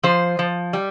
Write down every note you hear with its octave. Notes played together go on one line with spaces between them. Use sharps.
F3 C5
F3
G3